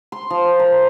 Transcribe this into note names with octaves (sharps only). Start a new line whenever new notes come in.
C6
F3
A#4